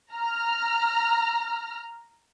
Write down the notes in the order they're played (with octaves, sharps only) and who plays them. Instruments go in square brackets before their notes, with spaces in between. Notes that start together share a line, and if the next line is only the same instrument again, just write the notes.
[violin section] A#5 F6